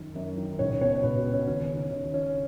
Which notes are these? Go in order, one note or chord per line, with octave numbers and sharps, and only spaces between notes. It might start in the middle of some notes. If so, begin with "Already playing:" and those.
Already playing: F#2 D#3
F#2
D#3
C#2 C#5
B2 C#5
C#2 B4
F#4
B2
C#4
D#2 C#4
C#4
C#3
D#4
D#2 C#4
C#3 C#4